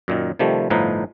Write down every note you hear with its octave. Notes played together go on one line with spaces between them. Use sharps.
F#2 A#2 D#3
C3 D#3 F3 G3 A3
G1 A2 F3 D#4 B4 A#5